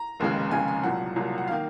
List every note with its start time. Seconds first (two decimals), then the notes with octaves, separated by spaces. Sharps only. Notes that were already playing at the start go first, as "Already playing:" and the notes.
Already playing: A#5
0.20 F1 D#2 C#3 G#3
0.51 F1 D#2 C#3 G#3 G#5
0.68 G#5
0.83 C2 A#2 F#3 F#5
1.16 C2 A#2 F#3
1.38 F#5
1.48 F5
1.51 D#3 A#3